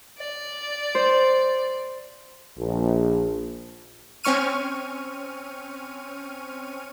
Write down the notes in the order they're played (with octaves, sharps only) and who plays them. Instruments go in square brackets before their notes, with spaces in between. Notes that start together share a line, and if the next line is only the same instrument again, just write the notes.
[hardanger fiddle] D5
[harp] C5
[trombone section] A#1
[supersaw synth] C4 C#4 C#6 F6 D#7